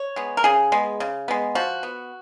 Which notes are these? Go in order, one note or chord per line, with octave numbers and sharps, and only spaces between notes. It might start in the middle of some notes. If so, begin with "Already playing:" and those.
Already playing: C#5
G#3 B3
A#4
C#3 G#4
G#3 B3
C#3
G#3 B3
F3 F#4
B3